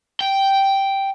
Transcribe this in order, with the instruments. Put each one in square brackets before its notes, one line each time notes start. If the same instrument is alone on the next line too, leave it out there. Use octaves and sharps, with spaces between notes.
[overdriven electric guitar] G5